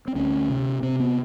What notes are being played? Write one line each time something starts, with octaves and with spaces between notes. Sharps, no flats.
C4
D2 C#4
C3
C3 C4
B3